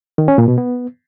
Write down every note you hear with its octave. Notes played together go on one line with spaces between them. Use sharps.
D#3
C#4
A#2
B2
B3